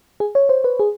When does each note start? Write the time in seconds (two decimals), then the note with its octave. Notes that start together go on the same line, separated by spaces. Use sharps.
0.20 G#4
0.35 C#5
0.49 C5
0.64 B4
0.79 G#4